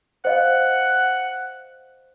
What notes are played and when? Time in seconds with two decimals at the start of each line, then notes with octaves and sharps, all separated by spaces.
0.25 C5 D#5 F5 F#5